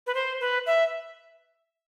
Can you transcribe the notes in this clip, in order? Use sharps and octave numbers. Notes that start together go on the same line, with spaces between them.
B4
C5
B4
E5